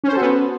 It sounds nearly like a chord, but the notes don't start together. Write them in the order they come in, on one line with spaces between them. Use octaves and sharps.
C#4 C5 A4 F#4 B3